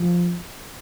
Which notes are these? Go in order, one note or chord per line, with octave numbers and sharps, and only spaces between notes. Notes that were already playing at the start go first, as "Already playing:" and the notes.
Already playing: F3